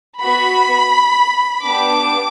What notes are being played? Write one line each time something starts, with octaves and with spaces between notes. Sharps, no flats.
B3 F#4 B5
B3 D4 G4 D6